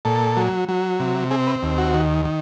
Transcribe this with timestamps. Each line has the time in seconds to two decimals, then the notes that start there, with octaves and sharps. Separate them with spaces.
0.05 A#2 A4
0.37 F#3
0.69 F#3
1.00 C3
1.31 C4 G#4
1.47 B4
1.62 D#2
1.78 F#4
1.94 D#3
2.25 D#3